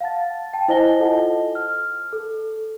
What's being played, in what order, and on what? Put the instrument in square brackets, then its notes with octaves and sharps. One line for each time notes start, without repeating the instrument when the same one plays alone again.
[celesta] F5 F#5 A5 A6
G5 A5
E4 C5 D#5 G#5 A#6 G7
F4 A4 D#5 F#5 A5
F6
A4